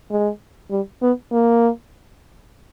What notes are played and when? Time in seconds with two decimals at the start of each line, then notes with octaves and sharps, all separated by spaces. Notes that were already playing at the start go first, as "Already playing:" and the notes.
0.11 G#3
0.71 G3
1.02 B3
1.32 A#3